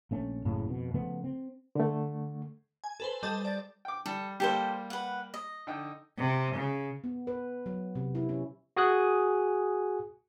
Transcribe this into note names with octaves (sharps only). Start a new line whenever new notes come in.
A#1 A3 C#4
F#1 A2 C#3
F2 B2
C#3 F3 A3 B3
C4
D3 A3
G#5
A4 B4 C5
G3 A4 D#5 A5 G6
D5 A6
G5 D6
G3 A4
G3 A#3 G4 A4 C5
B4 F#5
D#5
D3 D#4 G5
C3
C#3
B3
B4
F#3
C3
E4
C#4
F#4 G#4 G#5 D#6 F#6